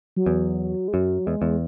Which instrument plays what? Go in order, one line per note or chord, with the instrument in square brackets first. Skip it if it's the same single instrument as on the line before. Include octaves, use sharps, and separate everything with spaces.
[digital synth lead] F#3
[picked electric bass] E2
[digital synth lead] G#3
[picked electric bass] F#2 [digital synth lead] F#3
[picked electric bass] E2 [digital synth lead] G#3
[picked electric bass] E2